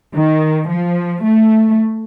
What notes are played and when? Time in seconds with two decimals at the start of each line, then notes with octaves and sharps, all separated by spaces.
0.14 D#3
0.69 F3
1.24 A3